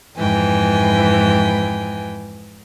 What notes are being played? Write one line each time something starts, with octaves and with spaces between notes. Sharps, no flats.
F2 G#2 E3 G5 G#5